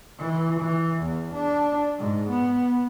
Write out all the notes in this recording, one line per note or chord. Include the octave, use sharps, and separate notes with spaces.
E3
E3
E2
D4
G#2
B3